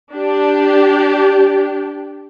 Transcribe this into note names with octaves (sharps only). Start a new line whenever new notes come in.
D4 G4